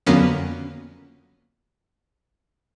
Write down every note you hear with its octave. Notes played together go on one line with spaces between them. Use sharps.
F2 D3 F#3 A#3 B3 C#4